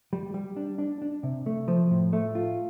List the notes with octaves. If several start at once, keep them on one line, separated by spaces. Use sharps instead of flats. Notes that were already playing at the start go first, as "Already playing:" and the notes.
G3
G3
D4
D4
D4
C3
A3
F3
A2
A3
F4